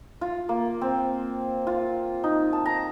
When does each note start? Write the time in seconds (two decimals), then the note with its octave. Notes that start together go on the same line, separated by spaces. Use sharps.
0.21 F4
0.49 A#3
0.81 C4
1.67 F4
2.24 D#4
2.53 A5
2.66 A#5